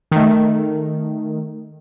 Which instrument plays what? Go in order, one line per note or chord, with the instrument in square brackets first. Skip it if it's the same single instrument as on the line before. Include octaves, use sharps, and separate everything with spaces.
[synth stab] D#3 A3